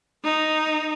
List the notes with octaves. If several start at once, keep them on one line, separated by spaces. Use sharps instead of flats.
D#4